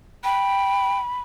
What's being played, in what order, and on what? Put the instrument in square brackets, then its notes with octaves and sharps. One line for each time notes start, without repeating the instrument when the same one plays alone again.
[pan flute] G5 [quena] B5